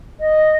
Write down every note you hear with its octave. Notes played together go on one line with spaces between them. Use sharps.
D#5